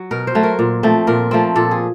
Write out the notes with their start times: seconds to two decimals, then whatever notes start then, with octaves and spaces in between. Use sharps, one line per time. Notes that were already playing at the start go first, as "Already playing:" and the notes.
Already playing: F#3
0.11 B2 A#4
0.27 C5
0.35 F#3 A3
0.43 A#4
0.59 A#2
0.83 F3 A3 C4
1.07 A#2 A#4
1.31 F3 A3 C4
1.56 A#2 A4
1.71 G#4